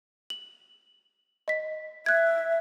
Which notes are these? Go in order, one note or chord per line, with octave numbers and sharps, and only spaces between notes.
F#7
D#5 B6
E5 F#6 G#6